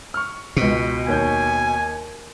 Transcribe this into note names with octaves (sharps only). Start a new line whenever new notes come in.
C#6 F6
C#2 B2 C#7
D#2 C#5 G#5 G6